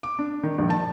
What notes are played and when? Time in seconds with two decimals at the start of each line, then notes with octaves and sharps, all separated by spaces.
0.03 D6
0.19 D4
0.43 D#3
0.58 A#1
0.70 A5